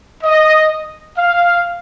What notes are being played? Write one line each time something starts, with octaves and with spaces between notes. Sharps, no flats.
D#5
F5